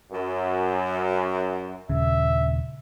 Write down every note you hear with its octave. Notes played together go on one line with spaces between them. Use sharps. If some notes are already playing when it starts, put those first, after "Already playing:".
F#2
D#1 C#3 E5